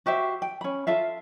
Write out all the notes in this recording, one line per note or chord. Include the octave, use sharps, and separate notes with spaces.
F#4 G4 C5 E5
G5
C#4 B5
F4 A4 E5 F5